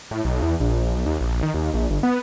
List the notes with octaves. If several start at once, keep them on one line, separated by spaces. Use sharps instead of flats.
A2
B1
E2
A#1
B1
D#2
A#1
D#3
D#2
A#1
G1
B3